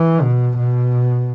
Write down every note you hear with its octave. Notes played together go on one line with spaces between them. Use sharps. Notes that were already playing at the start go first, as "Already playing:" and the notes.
Already playing: E3
B2
B2